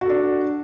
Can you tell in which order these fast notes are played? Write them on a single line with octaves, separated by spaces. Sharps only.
F#4 A4 D4